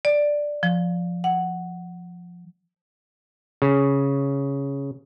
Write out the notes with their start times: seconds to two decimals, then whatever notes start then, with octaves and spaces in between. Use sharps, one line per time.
0.05 D5
0.63 F3
1.24 F#5
3.62 C#3